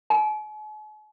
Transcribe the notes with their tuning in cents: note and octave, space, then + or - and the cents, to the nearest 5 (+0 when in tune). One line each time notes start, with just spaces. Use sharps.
G#5 +45